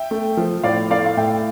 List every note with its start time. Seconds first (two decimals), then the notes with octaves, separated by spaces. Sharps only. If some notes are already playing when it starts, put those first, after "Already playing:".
Already playing: E5 G5
0.11 A3
0.37 F3
0.63 A2 D5 F5
0.91 A3 D5 F5
1.06 F5
1.17 A2 E5 G5